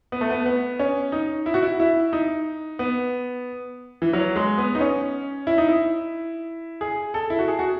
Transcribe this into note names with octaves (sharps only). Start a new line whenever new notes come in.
B3
A3
B3
B3
C#4
D#4
E4
F#4
E4
E4
D#4
B3
E3
F#3
G#3
B3
D#4
C#4
E4
D#4
E4
G#4
A4
E4
F#4
G#4
F#4